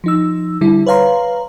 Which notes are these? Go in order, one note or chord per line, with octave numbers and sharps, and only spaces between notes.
F3 D#4 E6
D3 G3 E4
B4 C#5 F5 A#5 C6